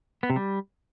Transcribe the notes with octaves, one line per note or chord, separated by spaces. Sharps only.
B3
C3
G3